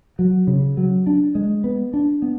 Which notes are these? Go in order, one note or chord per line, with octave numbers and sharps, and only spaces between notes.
F#3
C#3
F#3
D4
G#3
B3
D4
B3